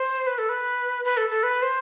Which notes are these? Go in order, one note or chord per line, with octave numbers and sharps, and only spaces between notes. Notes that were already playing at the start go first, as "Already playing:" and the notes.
Already playing: C5
B4
A4
B4
B4
A4
A4
B4
C5